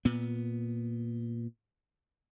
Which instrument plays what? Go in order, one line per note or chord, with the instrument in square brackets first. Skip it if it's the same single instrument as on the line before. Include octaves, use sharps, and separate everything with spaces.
[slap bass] A#2 B3